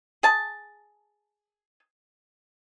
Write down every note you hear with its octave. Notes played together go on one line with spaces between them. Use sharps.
G#4 A5